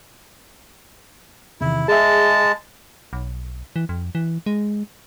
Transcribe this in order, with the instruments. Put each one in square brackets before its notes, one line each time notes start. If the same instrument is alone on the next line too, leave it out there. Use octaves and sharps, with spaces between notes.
[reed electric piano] E2 C3 D#3 [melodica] E4
[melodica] G#3 A5 [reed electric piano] G#4 E5
[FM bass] B1
E3
F2
E3
G#3